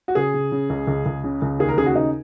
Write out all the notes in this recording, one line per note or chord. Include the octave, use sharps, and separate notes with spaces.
F#4
C#3 G#4
C#3
C#3
C#2
C#2
C#2
C#3
C#2
D#2 G#4
A#4
C#3 G#4
F#4
C#3 D#4